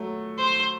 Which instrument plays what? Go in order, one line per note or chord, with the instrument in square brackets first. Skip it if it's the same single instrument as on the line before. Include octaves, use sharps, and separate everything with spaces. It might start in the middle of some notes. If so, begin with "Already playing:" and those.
Already playing: [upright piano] F#3 A3
[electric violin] C5